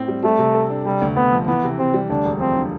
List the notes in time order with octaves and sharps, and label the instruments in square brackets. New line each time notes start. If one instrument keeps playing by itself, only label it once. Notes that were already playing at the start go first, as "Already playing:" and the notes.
Already playing: [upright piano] A2 C4
G3
[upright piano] G3 [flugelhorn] A3
[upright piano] C3
A4
D4
[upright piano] C3 [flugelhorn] G3
[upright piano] D2
[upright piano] D2 [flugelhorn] B3
[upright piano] F3
[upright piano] E3 [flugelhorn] B3
[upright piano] C3
[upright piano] C3 [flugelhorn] C4
[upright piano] G3
[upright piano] D2 [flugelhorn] D4
[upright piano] E1
[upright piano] F3 [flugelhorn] C4
[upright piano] D3